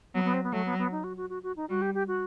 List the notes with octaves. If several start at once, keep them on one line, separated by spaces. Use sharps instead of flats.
F#3 B3
B3
C4
B3
F#3 A3
B3
B3
D#4
F#4
F#4
F#4
F#4
D#4
G3 F#4
G4
G4
F#4